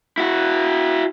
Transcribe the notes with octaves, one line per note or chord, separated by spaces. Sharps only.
E4 F#4